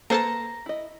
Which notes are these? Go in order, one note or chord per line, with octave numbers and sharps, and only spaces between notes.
A#3 A4 B4 C5 A5 A#5
E4 D#5